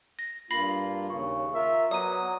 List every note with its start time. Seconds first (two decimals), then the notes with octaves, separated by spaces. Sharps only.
0.19 A#6
0.51 G2 A#3 F4 B5 A#6 C7
1.10 D#2 C#3 C#6
1.54 F4 A#4 E5
1.91 F#3 B3 D5 A#5 D#6 D#7